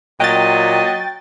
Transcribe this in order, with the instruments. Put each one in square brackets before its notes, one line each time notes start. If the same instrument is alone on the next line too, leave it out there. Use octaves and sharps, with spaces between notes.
[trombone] A#2 [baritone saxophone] F#3 [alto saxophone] D#5 [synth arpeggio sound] G5 A6